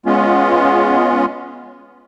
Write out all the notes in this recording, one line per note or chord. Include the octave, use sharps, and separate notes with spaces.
G#3 B3 C#4 F4